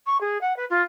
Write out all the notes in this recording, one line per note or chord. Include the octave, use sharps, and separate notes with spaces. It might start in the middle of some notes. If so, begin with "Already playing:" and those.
C#6
G#4
F#5
B4
F4